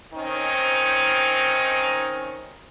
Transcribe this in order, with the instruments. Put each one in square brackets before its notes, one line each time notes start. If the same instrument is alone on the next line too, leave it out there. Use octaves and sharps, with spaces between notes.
[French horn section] D#3 C4 C#4 D#4